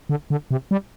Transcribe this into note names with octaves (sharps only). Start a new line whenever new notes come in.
D3
D3
C3
G3